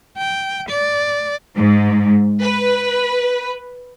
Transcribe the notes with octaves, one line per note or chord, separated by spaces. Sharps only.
G5
D5
G#2
B4